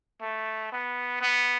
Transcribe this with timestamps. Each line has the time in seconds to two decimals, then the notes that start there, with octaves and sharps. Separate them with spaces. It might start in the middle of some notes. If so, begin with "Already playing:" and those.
0.21 A3
0.72 B3
1.21 B3